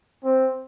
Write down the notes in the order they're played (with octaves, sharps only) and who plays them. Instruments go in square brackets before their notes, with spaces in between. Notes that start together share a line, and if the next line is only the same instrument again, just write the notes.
[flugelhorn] C4